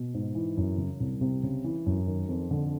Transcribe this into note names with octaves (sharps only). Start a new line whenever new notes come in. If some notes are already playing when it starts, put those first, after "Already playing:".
Already playing: B2
G#2
E3
F#2
C#3
C2
C3
C#3
E3
F#2
D#3
F2
D3